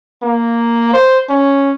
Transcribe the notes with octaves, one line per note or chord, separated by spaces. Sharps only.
A#3
C5
C#4